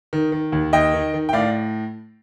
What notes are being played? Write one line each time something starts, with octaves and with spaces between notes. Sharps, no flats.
D#3
D#3
D#2
D#2 D#5 G5
D#3
D#3
G5
A2 D5 F5